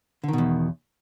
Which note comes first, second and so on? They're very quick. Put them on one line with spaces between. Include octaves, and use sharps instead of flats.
D3 D#3 B2 E2